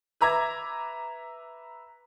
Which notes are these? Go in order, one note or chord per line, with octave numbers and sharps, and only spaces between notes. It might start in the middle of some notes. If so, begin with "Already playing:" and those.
B4 E5 A#5 D6 G#6